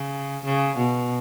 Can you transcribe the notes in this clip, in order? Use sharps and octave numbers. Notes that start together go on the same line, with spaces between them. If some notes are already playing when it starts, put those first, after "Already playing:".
Already playing: C#3
C#3
B2